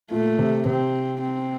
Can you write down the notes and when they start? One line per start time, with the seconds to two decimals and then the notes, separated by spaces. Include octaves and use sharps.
0.11 A#2 A3
0.39 C3
0.65 C3 C4
1.21 C4